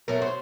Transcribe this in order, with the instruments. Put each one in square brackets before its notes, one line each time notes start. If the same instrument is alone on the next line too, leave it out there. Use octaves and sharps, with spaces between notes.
[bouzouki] B2 F#3 A3 A#4
C5